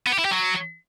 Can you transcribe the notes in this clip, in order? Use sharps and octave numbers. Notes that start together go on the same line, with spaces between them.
B3
G4
E4
G4
F#3